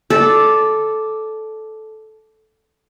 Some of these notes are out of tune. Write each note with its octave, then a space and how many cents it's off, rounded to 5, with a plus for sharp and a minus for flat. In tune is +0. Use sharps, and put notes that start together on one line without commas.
A4 -10 D5 +0